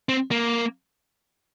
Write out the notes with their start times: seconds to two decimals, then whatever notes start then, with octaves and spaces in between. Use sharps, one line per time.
0.09 C4
0.31 A#3